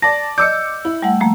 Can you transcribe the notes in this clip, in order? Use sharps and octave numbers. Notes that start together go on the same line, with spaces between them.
D5 A5 A#6
D5 D#5 D6 E6 G6 C#7
E4
G3 A3 F#5
F3 A3 A#3